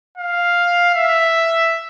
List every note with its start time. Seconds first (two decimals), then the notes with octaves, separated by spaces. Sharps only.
0.18 F5
0.95 E5